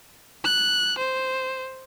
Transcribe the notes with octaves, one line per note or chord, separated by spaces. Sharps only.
F#6
C5